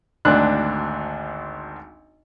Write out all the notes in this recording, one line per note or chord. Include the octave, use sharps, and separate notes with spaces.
G#1 D2 D4 F#6